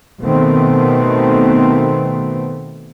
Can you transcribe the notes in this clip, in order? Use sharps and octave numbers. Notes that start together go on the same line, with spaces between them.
B2 D#3 A3 B3 C4